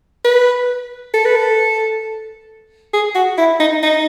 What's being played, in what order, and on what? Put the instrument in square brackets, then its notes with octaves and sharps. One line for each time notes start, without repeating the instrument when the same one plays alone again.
[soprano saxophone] B4
A4
B4
A4
G#4
F#4
E4
D#4
D#4